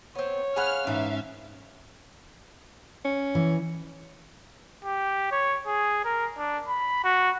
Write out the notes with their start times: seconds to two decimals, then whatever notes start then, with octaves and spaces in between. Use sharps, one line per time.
0.15 B3 C4 C#5
0.56 G#4 F5 F#5 G#5 B5 F6 F#6
0.87 G#2 E3 A3 C#4 E5 F5
3.05 C#4
3.35 E3
4.84 G4
5.31 C#5
5.66 G#4
6.04 A#4
6.37 D4
6.68 B5
7.04 F#4